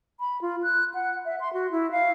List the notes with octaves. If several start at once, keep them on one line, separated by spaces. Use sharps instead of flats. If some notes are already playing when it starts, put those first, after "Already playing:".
B5
F4
F#6
F#5
E5
C6
F#4
E4
F5